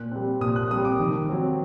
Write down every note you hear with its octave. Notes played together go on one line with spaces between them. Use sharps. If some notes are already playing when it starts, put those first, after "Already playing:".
Already playing: A#2 F#6
G3 C4
A#2 D#6
F#6
G3 C4 D#6
D6
D#3
F#3 C4